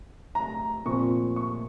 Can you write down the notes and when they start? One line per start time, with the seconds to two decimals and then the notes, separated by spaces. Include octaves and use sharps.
0.35 A#5
0.86 A#2 F3 C4 C#6
1.36 C#6